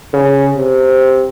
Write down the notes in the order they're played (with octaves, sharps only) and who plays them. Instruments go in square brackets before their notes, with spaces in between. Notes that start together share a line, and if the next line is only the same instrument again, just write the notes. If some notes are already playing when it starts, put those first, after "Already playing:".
[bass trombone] C#3
C3